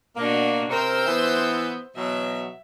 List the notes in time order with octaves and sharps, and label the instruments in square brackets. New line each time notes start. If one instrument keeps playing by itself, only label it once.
[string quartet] B2 D4 F#4 [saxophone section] A#3
[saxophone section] C3 A#4 [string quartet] C5 E6 G6
[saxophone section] E3 B3
[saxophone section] B2 E3 F#3 [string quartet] E5